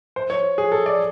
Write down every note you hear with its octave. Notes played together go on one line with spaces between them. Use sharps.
C5
C#5
G#4
A4
D5